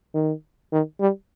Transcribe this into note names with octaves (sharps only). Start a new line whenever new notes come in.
D#3
D#3
G3